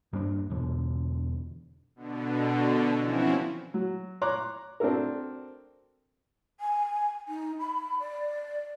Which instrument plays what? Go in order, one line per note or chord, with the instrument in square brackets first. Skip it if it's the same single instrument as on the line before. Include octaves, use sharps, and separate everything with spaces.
[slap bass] G2 G3 A#3 D4
E2 B2 D3
[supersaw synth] B2 D3
E3 F3 C4 C#4 E4 F#4
[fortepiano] F#3
C#5 A#5 C6 D6 F#6
C4 D4 F#4 A4 A#4
[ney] G#5
D#4
B5
D5